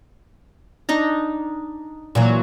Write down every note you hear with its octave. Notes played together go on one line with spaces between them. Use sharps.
D4 D#4 A#5
A#2 E3 F#3